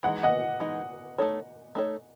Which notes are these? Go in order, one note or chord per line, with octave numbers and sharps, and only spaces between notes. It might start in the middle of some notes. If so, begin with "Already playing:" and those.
E3 G#3 D#4 F#5
D#5 F#5
E3 G#3 D#4
A3 D#4 A4 C#5
A3 D#4 A4 C#5